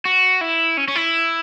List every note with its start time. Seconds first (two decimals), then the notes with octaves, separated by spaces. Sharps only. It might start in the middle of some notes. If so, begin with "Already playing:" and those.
0.05 F#4
0.41 E4
0.77 C#4
0.88 C#4
0.95 E4